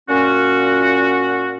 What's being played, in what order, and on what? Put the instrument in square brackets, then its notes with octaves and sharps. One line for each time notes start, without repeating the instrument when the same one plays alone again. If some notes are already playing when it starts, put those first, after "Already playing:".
[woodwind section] A#2 C#4 F#4